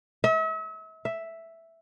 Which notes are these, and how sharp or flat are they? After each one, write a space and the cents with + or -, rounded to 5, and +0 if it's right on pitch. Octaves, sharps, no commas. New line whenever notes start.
E5 -40
E5 +0